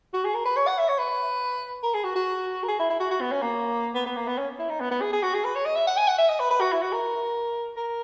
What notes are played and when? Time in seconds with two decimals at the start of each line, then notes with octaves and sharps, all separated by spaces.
0.14 F#4
0.24 G#4
0.34 A#4
0.45 B4
0.56 C#5
0.67 F#5
0.78 E5
0.89 C#5
0.98 B4
1.83 A#4
1.94 G#4
2.04 F#4
2.16 F#4
2.63 A#4
2.68 G#4
2.79 E4
2.90 E4
3.00 F#4
3.11 F#4
3.21 B3
3.32 C#4
3.42 A#3
3.95 B3
4.06 B3
4.16 A#3
4.27 B3
4.38 C#4
4.59 E4
4.70 D#4
4.80 B3
4.91 B3
5.01 G#4
5.13 G#4
5.23 F#4
5.34 G#4
5.45 B4
5.55 C#5
5.66 D#5
5.76 E5
5.87 F#5
5.97 G#5
6.08 F#5
6.18 E5
6.29 D#5
6.40 B4
6.50 B4
6.61 F#4
6.72 E4
6.82 F#4
6.92 A#4
7.77 A#4